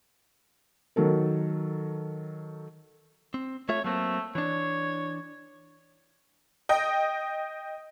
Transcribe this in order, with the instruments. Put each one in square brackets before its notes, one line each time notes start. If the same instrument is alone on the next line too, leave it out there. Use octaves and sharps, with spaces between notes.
[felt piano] D#3 F#3 A4 A#4
[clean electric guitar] C4
[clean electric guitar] A3 F4 E5 [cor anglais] C#5
[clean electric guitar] F#3 A#3 C4 [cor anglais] A3
[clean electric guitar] E3 D4 [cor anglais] C#5
[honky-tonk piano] D#5 G5